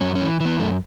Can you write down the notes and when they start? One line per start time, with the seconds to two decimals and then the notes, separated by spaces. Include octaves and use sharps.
0.01 F#2 C#4
0.15 C#4
0.21 E3
0.40 E3
0.45 B3
0.59 F#2 A3